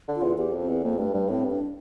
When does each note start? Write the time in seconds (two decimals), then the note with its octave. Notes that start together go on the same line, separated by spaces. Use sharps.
0.08 D3
0.16 F4
0.23 E2
0.38 E2 G4
0.53 F2
0.62 C4
0.69 E2
0.84 F2 A#3
0.99 G2 A3
1.13 G2 G3
1.29 A2 C4
1.44 G2
1.51 D4